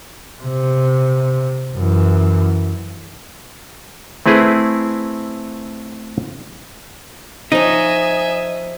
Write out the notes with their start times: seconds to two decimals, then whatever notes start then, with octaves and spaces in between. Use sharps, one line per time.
0.43 C3
1.77 F#2 E3
4.26 A3 C4 E4 G#4 B4
7.52 F3 D#4 C#5 D#5 E5 G#5